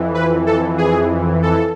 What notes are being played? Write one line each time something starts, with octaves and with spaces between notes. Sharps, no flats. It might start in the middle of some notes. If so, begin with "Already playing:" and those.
Already playing: F2 E3
B4
A4
G#4
A4